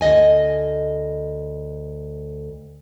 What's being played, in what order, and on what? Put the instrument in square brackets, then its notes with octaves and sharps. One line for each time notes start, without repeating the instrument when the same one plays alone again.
[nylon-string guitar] D2 F3 D#5 G#5